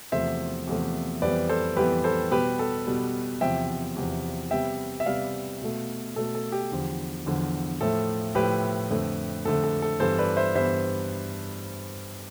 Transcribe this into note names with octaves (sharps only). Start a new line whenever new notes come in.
E2 C3 F3 A3 C5 E5
E2 C3 F3 A3
F2 E3 G3 B3 B4 D5
A4 C5
F2 E3 G3 B3 G4 B4
A4 C5
B2 G3 B3 G4 B4
A4
B2 G3 B3
E2 C3 F3 E5 G5
E2 C3 F3
C3 G3 B3 E5 G5
E5
C3 G3 B3 D5 F5
B2 A3
B2 A3 A4
A4
G4
E2 D3 F3
E2 D3 F3
A2 F3 A3 A4
A2 F3 A3 G4 B4
F2 D3 A3
F2 D3 A3 A4
A4
A4
G2 E3 B3 A4 C5
B4 D5
C5 E5
G2 E3 B3 C5 E5